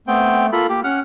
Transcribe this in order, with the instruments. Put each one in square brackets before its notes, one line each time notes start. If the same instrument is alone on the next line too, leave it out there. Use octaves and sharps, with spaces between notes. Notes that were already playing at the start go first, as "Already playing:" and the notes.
[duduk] A3 [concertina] B3 C4 G5
[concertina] A#3 A4 B5 [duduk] F4
[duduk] A#3 [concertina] G4
[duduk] C#4 [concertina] F#5 F6